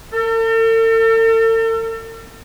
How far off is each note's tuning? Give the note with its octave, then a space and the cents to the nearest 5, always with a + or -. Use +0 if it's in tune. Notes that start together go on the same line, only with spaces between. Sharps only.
A4 +45